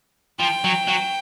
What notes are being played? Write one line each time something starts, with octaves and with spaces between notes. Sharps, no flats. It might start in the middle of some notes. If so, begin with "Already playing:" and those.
F3 G5
F#3
F#3